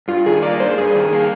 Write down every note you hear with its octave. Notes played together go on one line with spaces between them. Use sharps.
G2 F4
D#3 G#4
A#3 D5
G2 C5
G2 G#4
D#3
A#3